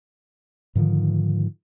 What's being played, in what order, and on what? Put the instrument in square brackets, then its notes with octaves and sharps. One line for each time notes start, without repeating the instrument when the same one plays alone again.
[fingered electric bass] G#2 D3 D#3 F3